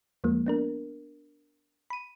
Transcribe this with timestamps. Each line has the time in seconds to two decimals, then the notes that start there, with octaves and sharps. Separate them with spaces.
0.24 E2 F3 G#3 A#3
0.47 B3 D4 A#4
1.90 B5 D#7